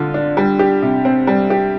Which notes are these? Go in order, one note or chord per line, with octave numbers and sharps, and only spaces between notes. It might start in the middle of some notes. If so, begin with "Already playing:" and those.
Already playing: D3 D4 F4
D4
G3
G4
C3
C4
G3
G4